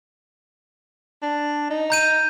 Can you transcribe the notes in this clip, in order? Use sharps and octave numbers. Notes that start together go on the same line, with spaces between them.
D4
D#4
A#5 G6 D#7